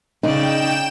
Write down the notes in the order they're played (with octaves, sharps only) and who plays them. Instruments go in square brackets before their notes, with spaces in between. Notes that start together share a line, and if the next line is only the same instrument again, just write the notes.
[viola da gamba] C#3 D5 [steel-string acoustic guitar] D#4 [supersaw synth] G5 E7